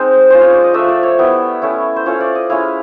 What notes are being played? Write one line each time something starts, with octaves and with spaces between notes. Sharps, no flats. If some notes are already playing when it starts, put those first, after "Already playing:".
Already playing: G#3 C4 D#4 C5
G#3 C#4 F4 C5
C#5
D5
D#5
F3 A3 D4 E5
D5
C#5
G3 B3 E4
A3 C#4 E4
C5
A3 C#4 F4 C#5
D5
D#5
G#3 C#4 E4 F5